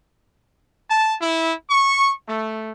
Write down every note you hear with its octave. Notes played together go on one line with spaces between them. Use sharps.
A5
E4
C#6
A3